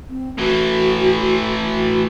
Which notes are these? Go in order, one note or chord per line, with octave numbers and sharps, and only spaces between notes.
C4
A2 E3 F#4
F#4